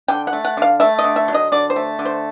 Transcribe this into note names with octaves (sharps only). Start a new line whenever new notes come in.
D3 G5
F#5
A3
F#5
D3 F5
A3 E5
D#5
D3
E5
F#3
D#5
D3 D5
C5
A3
D3
C5